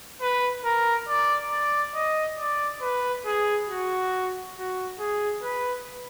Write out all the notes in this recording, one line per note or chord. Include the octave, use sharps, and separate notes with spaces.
B4
A#4
D5
D5
D#5
D5
B4
G#4
F#4
F#4
G#4
B4